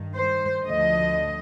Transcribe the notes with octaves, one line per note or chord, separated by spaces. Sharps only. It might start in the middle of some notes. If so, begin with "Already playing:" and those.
Already playing: G2 D#3
C5
D2 D3 F3 D#5